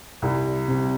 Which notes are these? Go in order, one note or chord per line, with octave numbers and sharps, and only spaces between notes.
C2 G3
C3